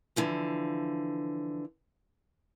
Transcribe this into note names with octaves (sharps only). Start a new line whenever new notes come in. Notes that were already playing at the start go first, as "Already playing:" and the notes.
D3 E3 F3